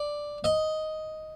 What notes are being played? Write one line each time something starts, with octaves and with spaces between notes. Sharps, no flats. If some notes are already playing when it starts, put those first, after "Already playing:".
Already playing: D5
D#5